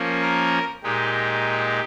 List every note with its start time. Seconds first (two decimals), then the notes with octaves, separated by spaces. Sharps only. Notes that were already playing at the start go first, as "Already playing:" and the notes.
Already playing: F3 A#3 C#4
0.23 A#4
0.83 A#2 G#3 D#4 G4